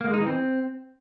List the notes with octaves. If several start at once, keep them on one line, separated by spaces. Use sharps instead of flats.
A#3
G#3
D#4
E3
C4